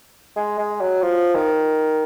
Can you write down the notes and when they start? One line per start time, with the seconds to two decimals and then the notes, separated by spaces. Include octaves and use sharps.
0.36 G#3
0.58 G#3
0.81 F#3
1.02 F3
1.35 D#3